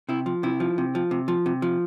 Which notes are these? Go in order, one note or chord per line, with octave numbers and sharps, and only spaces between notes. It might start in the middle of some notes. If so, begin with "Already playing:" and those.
C3 E4
F3
C3 E4
F3
C3
F3
C3
F3
C3
F3